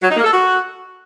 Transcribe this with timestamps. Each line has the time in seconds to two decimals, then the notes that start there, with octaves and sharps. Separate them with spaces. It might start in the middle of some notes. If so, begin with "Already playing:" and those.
0.01 F#3
0.09 D#4
0.16 A#3
0.24 A4
0.32 F#4